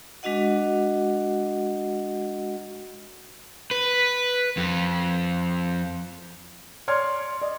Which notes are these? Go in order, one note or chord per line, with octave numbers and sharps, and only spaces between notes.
G#3 D4 F#4 D#5 F#5
B4
F2
C#5 D5 C6 F6 G#6
D5 D#5